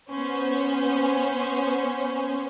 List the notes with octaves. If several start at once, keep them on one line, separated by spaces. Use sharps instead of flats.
B3 C#4 C5